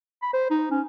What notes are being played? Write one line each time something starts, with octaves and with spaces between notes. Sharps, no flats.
B5
C5
D#4
C#4